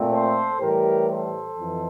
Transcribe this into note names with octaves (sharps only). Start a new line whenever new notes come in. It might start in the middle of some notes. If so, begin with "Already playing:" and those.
Already playing: A#2 A3 C4
A4 C5
A2 E3 G3 G4 A#4
A4 C5
F2 E3